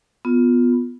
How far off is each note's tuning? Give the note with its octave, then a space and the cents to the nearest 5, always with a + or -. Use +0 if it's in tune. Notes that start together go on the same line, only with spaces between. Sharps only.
B3 +0 F4 +10